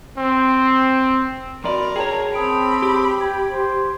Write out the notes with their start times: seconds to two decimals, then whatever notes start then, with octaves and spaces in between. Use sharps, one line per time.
0.18 C4
1.64 F2 F#4 A#4 D5 B5 C6
1.96 G#4 C#5 G5 A5
2.34 C4 A5 B5 D#6 D7
2.82 G4
3.21 G5 G#6
3.51 C5